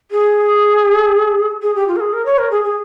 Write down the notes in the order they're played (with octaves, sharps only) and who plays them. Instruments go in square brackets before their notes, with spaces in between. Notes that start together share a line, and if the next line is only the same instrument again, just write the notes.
[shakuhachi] G#4
G#4
G4
F4
A#4
G#4
A#4
C#5
A#4
G#4
G#4